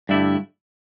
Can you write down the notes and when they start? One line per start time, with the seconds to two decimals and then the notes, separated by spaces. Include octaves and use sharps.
0.09 G2 D3 A3 E4